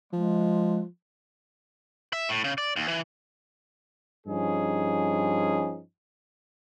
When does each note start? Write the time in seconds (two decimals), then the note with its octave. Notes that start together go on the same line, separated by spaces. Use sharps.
0.13 F3 G#3
2.13 E5
2.29 A2
2.44 C#3
2.58 D5
2.76 D#2
2.88 E3
4.27 G2 F3 C#4 D#4 G#4